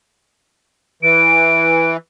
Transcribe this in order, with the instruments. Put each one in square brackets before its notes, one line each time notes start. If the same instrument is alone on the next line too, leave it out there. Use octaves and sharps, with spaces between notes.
[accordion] E3 [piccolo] D7